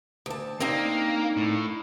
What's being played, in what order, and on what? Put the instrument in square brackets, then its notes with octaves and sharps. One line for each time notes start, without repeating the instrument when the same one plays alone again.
[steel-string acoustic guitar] D2 A5
[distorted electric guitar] A#3 [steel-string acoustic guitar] C4 D4 D#4
[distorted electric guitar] A2